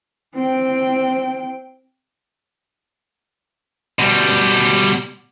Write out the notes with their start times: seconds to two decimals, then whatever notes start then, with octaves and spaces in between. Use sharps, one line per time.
0.35 C4 G5
3.99 B2 G3